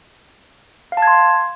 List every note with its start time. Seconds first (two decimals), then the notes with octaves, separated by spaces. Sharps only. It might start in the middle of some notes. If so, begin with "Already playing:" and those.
0.92 F5
0.97 A5
1.02 G#6
1.07 C6